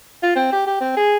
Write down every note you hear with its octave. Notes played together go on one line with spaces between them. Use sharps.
F4
C4
G4
G4
C4
G#4